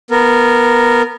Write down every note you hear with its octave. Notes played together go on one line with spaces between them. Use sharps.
B3 A#4